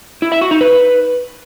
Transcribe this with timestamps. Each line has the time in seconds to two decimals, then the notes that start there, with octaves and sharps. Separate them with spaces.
0.22 E4
0.32 E5
0.41 F#4
0.51 D#4
0.61 B4